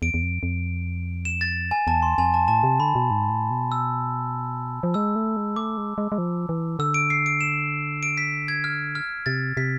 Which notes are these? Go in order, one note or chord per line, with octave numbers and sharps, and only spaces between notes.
E2 D7
E2
F2
F2
E7
A6
G#5
E2 A5
C6
F2 G#5
A5
A2 A5
C3
D3 B5
B2
G#2
A2
B2
E6
F3
G#3 E6
A3
G#3
A3 D6
G#3
G#3
G#3
F3
E3
D3 E6
D7
C7
D7
E7
D7
B6
G#6
F6
F6
C3 A6
C3 B6